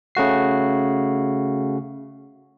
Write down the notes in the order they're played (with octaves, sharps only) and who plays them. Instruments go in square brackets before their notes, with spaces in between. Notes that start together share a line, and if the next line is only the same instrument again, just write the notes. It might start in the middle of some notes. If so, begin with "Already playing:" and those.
[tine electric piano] C#3 A3 F#4 C7